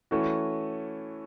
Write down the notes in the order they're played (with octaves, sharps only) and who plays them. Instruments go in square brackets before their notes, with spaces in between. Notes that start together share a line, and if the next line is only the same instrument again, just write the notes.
[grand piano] E3 A3 C#4 F#4